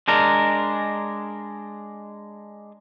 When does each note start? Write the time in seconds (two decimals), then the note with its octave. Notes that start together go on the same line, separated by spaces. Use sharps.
0.08 G#3 D4 A#4